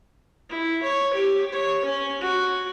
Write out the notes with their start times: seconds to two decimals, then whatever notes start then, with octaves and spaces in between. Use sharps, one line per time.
0.49 E4
0.82 C#5
1.13 G4
1.52 C#5
1.85 C#4
2.21 F#4